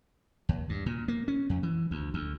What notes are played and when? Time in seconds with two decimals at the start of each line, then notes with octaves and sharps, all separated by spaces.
0.49 D#2
0.69 G2
0.86 A#2
1.08 A#3
1.28 C#4
1.50 F2
1.63 E3
1.91 D2
2.14 D2